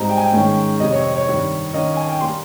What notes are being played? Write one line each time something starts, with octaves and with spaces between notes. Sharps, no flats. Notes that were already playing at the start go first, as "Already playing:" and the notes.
Already playing: G#2 G3 C4 D#4 A#5
G5
G#5
G5
G#2 D#3 G#3 C#4
F2 C3 G3 D#5
C#5
C#5
G2 D#3 G3
D#2 D#3 A#3 C#4 D#5
G#5
G5
G3 A#3 C6